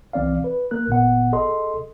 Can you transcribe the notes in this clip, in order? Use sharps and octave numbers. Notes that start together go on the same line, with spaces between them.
C2 E3 C4 D5 F5
B4
A#3 A#4 F#6
G1 A#2 B3 F#5
G#4 A4 D#5 C6